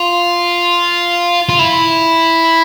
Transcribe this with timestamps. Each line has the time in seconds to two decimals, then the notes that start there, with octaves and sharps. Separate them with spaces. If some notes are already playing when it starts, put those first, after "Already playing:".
Already playing: F4
1.49 F4
1.59 E4